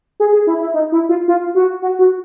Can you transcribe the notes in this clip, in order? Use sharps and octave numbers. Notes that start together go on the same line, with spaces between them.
G#4
G#4
E4
E4
D#4
E4
F4
F4
F#4
F#4
F#4